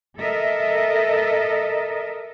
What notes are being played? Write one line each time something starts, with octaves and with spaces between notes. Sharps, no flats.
A4 A#4 D#5 E5